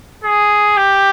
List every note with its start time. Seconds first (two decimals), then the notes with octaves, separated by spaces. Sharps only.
0.24 G#4
0.77 G4